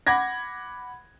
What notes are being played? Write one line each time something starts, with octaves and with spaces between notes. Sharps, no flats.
F#5 B5 D6 G#6 A#6